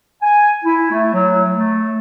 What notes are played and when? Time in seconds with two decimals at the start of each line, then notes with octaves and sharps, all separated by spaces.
0.22 G#5
0.65 E4
0.91 A3
1.13 F#3
1.55 A3